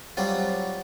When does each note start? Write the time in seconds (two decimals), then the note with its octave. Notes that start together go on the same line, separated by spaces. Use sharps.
0.17 F#3 G3 C4 F4